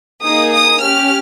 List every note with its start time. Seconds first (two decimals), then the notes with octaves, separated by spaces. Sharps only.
0.23 A#3 D#4 G#4 D#6
0.52 D#6
0.81 C#4 G4 F6